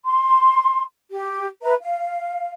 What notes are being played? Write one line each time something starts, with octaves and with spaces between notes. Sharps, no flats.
C6
G4
B4 E5 A#5
F5